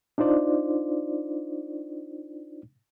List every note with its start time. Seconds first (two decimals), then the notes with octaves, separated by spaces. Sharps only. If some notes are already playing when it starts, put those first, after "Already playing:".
0.18 D4 D#4 F4 C5 D5